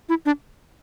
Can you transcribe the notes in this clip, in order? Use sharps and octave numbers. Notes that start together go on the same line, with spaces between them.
E4
D4